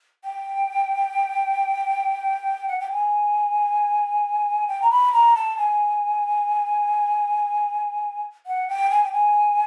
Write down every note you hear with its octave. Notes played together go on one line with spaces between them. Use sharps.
G5
F#5
G5
G#5
G5
A#5
B5
A#5
A5
G#5
F#5
G5
G#5
G5
G#5